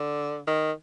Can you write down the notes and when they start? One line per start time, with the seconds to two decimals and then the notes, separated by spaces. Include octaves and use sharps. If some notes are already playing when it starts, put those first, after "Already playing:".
Already playing: D3
0.47 D#3